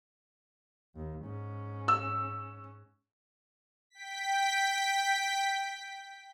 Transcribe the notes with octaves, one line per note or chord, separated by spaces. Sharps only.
D#2
G#2 C#4
E6
G5 B6